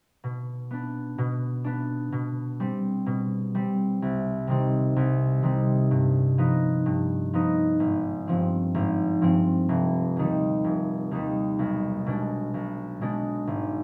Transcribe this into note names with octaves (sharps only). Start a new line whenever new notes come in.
B2
B3 D4
B2
B3 D4
B2
G3 C4
B2
G3 C4
C2
C3 D#3 G3 C4
C2
C3 D#3 G3 C4
G2
F3 B3 D#4
G2
F3 B3 D#4
G#1
G2 F3 C4
G#1
G2 F3 C4
F1
D#2 D#3 G3
F1
D#2 D#3 G3
B1
B2 G#3 D4
B1
B2 G#3 D4
G#1